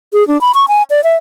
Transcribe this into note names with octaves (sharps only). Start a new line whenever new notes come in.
G#4
D4
B5
C#6
G#5
D5
E5